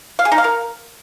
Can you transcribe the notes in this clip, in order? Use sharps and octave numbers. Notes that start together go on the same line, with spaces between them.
F5
G#4
D#4
F5
A#4